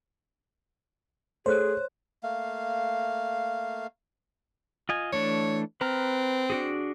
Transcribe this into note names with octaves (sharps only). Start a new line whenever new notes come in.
A3 G#4 C5 C#5 F#6
A3 A#3 F5
F4 D#5 G#5
E3 A3 D4 C#5
C4 B4 A#5 F6
D4 F#4 G#4